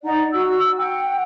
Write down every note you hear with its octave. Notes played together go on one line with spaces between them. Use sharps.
D#4 D5 F#5 A#5
F#4 E6
F#5 G5